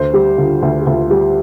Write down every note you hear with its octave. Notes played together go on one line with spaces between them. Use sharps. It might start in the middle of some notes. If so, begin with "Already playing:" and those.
Already playing: D2 C5
G3 G4
D3 F4
D2 G4
G4
D2 F4
G3 G4